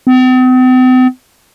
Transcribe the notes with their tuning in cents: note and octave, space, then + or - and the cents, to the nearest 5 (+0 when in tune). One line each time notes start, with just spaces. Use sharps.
C4 -45